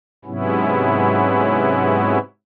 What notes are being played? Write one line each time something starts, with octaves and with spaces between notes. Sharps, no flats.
G#2 C3 F#3 B3 C#4 E4